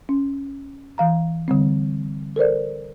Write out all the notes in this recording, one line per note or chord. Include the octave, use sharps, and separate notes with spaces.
C#4
E3 F5 A#5
D3 G3 C4
A4 A#4 C5 D5